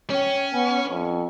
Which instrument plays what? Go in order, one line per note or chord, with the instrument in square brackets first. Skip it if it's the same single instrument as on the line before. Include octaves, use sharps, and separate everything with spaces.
[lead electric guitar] C#4 [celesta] C#5 G5
[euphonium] B3 [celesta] G#5
[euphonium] F2